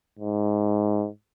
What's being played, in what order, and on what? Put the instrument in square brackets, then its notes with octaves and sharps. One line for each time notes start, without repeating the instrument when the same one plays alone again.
[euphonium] G#2